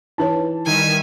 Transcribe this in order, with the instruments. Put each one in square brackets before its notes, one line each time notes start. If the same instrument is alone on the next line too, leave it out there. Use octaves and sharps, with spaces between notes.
[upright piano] E3 A5 [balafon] D#4 B4 C#5
[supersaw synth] D#3 [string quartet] G3 E5 G#5